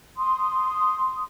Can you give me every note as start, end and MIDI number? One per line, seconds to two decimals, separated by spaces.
0.17 1.23 84
0.17 1.23 87